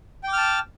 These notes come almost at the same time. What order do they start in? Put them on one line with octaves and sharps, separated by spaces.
G5 D6 F6 A5